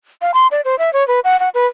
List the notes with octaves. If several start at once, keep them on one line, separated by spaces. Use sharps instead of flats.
F5
C6
D5
C5
E5
C#5
B4
F#5
F#5
B4